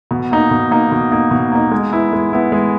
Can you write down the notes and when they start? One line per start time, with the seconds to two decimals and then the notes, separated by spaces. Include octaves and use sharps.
0.11 B2
0.31 A#3 D#4
0.51 B2
0.71 A#3 D#4
0.92 B2
1.12 A#3 D#4
1.31 B2
1.52 A#3 D#4
1.71 G#3
1.93 B3 E4
2.13 G#3
2.33 B3 E4
2.52 G#3